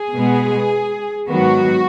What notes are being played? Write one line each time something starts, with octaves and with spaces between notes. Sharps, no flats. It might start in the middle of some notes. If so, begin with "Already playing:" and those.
Already playing: G#4
B2 G#3 B3
G#2 D#3 F#3 B3 F#4